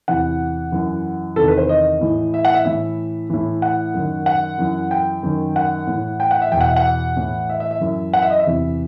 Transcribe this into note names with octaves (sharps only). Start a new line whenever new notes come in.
E2 C3 E3 F#5
F#2 E3
E2 C3 D#3 A4
B4
C5
D#5
A2 E3
E5
F#5
E5
A2 E3 E5
A2 E3
F#5
F#2 D#3
F#5
F#2 E3
G5
F#2 D#3
F#5
A2 E3
G5
F#5
E5
E2 G5
B2 F#5
E5
F#5
A2 E3
E5
E5
E5
F#2 E3
F#5
E5
D#5
E5
E2 C3 E3